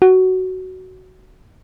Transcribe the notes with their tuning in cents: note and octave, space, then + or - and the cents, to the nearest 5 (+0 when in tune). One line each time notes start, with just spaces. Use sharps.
F#4 +10